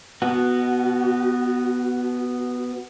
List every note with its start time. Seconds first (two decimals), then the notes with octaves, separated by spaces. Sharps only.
0.22 B3 F#4